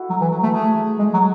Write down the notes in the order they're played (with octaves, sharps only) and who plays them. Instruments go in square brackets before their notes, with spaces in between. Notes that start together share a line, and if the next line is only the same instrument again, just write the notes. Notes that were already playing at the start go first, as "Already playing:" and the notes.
Already playing: [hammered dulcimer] E4 F#4 A4
[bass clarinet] F#3
E3
F#3
A3
[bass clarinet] A3 [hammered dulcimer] G#4
[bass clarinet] G#3
F#3